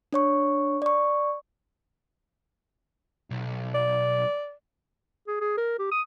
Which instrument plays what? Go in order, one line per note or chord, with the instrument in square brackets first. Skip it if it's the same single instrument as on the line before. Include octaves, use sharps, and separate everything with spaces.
[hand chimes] D4 C#5 C#6
D5 C#6
[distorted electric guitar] B1
[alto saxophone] D5
[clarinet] G#4
G#4
A#4
G4
D#6